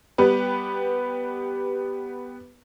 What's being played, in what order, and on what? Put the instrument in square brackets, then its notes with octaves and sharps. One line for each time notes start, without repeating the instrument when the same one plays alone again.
[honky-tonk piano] G3 B3 G4 B4